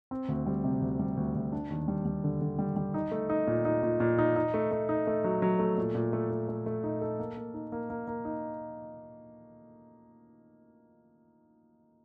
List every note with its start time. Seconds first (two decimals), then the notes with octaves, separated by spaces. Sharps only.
0.11 C4
0.28 D2
0.46 G3
0.64 C3
0.81 D2
0.99 G3
1.17 D2
1.35 D2
1.52 D4
1.70 D#2
1.88 G3
2.05 G3
2.24 D3
2.41 D3
2.59 G3
2.76 G3
2.94 D#4
3.11 A3
3.30 D#4
3.47 A#2
3.65 D#4
3.83 A#2
4.00 A#2
4.19 D#4
4.36 D#4
4.54 A3
4.71 A3
4.89 D#4
5.07 A3
5.24 F#3
5.42 F#3
5.59 A3
5.78 A#2
5.95 A#2
6.13 A3
6.30 A3
6.49 A3
6.66 A3
6.84 D#4
7.01 A4
7.19 A#3
7.37 A#3
7.54 D#4
7.72 A#3
7.90 A#3
8.07 A#3
8.25 D#4